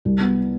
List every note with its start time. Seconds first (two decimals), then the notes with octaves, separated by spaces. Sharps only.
0.05 C2
0.20 B3